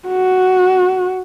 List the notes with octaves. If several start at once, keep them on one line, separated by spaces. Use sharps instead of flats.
F#4